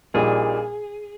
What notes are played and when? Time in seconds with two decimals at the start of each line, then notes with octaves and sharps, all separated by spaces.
0.14 A#1 A#2 G3 A#3 D#4 G#4